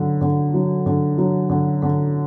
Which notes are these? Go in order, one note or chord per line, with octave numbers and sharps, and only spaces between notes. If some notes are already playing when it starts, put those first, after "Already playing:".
Already playing: D3 F#3
D3
F#3
D3
F#3
D3
D3